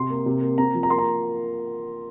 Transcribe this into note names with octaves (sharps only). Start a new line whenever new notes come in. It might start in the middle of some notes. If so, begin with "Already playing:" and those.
Already playing: C3 C6
A#3
C3
A#3
C4 A#5
F3
A#5
A#3 C6
A#5